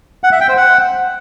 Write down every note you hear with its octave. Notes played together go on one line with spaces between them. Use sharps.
F#5
E5
G5
C5
F#5